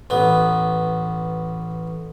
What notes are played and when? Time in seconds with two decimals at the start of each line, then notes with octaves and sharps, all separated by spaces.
0.10 A1 B3